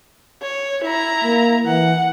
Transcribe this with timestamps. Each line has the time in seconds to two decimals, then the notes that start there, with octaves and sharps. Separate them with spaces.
0.43 C#5
0.84 E4 A#5
1.24 A#3
1.66 E3 F#5